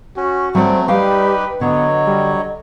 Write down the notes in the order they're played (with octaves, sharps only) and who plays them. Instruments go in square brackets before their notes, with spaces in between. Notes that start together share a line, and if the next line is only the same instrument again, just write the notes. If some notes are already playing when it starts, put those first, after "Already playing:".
[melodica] C#4 [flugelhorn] F#4
[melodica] F#3 A3 [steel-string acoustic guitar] G3 D5 [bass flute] C4
[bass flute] G3 [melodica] D#4 G4 [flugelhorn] B4 [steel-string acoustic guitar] F5 G5
[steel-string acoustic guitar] D3 [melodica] F#3 C#5 [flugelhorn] B3 [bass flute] D#5
[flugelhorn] G3